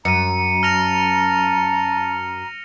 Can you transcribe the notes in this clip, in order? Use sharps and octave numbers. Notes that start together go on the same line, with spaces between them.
F#2 A#5 C#7 D#7
A5 F6 A#6 F7